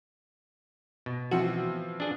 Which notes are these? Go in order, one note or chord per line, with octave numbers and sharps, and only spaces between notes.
B2
E3 F3 C4 F#4
D4 G#4